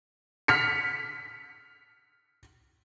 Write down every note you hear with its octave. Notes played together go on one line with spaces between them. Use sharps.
F6 B6 C#7